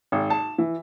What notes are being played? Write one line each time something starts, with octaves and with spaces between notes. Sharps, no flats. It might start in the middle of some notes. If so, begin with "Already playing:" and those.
G#1
A5
E3